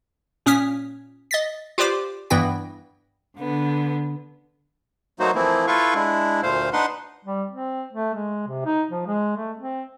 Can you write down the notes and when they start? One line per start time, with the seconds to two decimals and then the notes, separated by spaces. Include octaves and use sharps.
0.46 A#2 C#4 D#6 F6 B6
1.31 D#5 A6 B6
1.78 F4 G4 B4 C5 D5 D6
2.30 G2 E3 B3 E4 G5 A#6
3.38 D3 B3
5.19 F#3 A3 A#3 D#4 F#4 C5
5.35 E3 F3 A3 A#3 C4 E4
5.67 E4 F4 A4 B4 F5 C#6
5.94 G#3 D4 E4
6.43 D2 A#2 A3 C5 F5
6.73 D4 D#4 B4 F#5 C6
7.25 G3
7.51 C4
7.93 A3
8.14 G#3
8.47 C3
8.65 D#4
8.91 F3
9.06 G#3
9.37 A3
9.58 C4